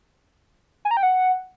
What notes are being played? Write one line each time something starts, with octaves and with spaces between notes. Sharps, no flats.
G#5
A#5
G5
F#5